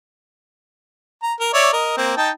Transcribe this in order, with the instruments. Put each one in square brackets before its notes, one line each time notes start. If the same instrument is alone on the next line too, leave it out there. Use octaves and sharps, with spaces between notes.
[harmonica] A#5
A#4
C#5 D5 E5
A#4 D#5
A#3 C4
D#4 G5 A5